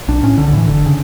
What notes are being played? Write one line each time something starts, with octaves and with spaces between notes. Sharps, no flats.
B1 D4
A2 C#4
B1 D3
D3
A2 E3
F#1 D3
C#3